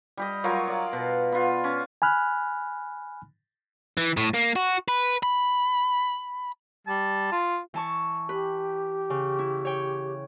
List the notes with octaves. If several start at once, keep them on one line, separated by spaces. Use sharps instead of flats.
G3 G4 D#5
F#3 F4 A#4 C#5
D5 F5
B2
B3 F4
C#4
G#5 B5 F6 F#6
E3
A2
A#3
F#4
B4
B5
G3 A5
F4
E3 A5 C#6
G4 B4
C#3
E4
C#5 G5